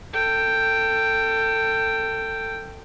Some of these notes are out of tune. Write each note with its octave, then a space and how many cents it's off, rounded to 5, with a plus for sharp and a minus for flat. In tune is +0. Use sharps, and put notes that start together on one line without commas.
A4 +25 G5 +0